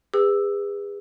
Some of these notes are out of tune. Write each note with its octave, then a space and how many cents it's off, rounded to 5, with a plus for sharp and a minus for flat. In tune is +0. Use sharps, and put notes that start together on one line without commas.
G#4 -35 B4 +0 E6 +0